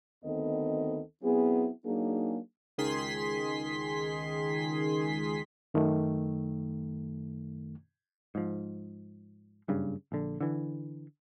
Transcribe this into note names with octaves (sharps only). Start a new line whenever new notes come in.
D2 D#3 B3 C4 A4 D#5
F#3 B3 C4 E4 G#4
F#3 A#3 D4 D#4 G#4
C#2 D#3 G#4 C6 B6
F#2 D#3 A3
G#2 F3
F#1 G2 C#3
A#1 D3
D3 E3